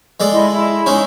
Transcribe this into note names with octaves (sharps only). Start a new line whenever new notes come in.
G#3 A4 D5
E4 D#5 C6
E4
G#3 C#4 D#4